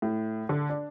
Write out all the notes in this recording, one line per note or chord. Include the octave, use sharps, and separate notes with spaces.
A2
D3
D4